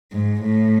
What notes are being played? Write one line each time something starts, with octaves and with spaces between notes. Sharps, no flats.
G#2
A2